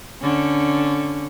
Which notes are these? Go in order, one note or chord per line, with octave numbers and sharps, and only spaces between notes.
D3 C#4